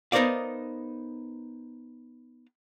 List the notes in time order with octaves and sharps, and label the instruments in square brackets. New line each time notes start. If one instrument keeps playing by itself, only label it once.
[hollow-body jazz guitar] B3 D#4 A#4 C5 D5 F5